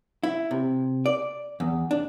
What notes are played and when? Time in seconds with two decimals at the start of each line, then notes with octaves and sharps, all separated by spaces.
0.23 E4
0.51 C3
1.06 D5
1.60 E2
1.91 D4